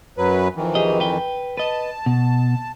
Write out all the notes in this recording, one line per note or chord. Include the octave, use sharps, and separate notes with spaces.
F#2 F#3 B4
F2 D#3 E3
G4 G#4 D#5
B4 G5
B4 D#5 A5
B2